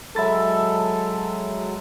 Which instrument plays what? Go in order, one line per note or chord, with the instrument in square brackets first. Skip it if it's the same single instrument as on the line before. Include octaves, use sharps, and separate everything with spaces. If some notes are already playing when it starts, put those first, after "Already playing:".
[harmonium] F#3 G#3 [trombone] A4 [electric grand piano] E5 B5 A6